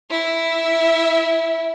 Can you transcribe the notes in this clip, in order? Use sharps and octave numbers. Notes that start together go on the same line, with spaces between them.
E4 E5